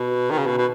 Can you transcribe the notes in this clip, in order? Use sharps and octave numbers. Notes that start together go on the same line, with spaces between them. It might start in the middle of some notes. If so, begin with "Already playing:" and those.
Already playing: B2
D#3
C#3
B2
B2